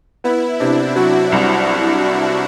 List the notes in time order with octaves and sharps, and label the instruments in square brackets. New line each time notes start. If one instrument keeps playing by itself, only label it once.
[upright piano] B3 [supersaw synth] E4
[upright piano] C3 [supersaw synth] D4
[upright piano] F#3 [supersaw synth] F#4
[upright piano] C2